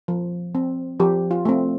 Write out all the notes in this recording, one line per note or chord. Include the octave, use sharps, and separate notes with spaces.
F3
C4
F3 G4
F4
A3 C4